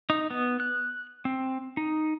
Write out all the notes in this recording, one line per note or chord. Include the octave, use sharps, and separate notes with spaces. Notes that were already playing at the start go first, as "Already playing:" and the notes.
D#4
B3
F#6
C4
D#4